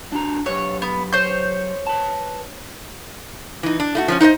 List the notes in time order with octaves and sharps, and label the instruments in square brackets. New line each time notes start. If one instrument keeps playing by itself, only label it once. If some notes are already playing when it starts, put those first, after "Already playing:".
[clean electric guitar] D4 F#4 A#5
[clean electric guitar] F#3 G4 B4 [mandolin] C#5
[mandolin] B3
C5 C#5 G6
[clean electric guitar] B4 A5
[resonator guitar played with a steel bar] E3 D#4
D4
A3 D#4 F#4
F3 G#3 C#4
D#4 C5 C#5 D#5